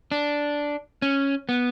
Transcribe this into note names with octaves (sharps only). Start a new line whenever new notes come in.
D4
C#4
B3